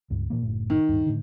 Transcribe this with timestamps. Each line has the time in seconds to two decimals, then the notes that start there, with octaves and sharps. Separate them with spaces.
0.10 C#2 G2
0.30 A#2 E3 A#3
0.43 F#1 A2
0.70 D#3
0.89 D1 G2
1.06 A2 D3